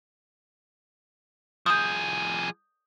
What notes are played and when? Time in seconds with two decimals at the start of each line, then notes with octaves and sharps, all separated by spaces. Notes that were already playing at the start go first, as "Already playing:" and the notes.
1.66 F3 G#4 D#6 G6